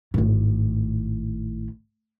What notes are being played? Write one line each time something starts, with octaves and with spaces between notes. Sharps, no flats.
G#1 A2